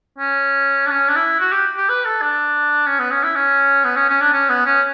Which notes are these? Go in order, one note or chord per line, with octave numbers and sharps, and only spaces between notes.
C#4
D4
C#4
D4
E4
F#4
G4
G4
B4
A4
D4
C#4
B3
C#4
E4
C#4
B3
C#4
C#4
D4
C#4
B3
C#4